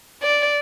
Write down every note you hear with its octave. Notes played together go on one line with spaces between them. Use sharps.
D5